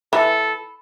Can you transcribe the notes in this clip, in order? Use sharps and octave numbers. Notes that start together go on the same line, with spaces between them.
E3 A4 B5